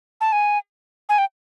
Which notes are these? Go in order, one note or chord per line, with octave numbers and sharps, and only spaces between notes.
A5
G#5
G#5
G5